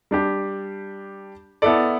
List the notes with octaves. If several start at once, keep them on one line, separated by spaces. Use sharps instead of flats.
G3 D4 G4
B3 E4 A4 D5